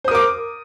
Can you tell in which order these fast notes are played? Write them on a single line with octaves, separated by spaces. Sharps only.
C5 D#6 A#4 D6